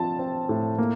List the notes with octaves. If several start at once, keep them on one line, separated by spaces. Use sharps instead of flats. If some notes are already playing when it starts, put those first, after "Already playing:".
Already playing: F3 C4 F4 A5
C4
A2
A#3